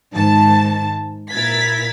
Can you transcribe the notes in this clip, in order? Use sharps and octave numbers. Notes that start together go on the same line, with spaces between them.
G#2 D#3 A5
A#2 E4 A#4 G#6 A6 B6